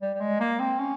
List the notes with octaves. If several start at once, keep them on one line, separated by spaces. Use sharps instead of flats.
G3
G3
G#3
A#3
C4
C#4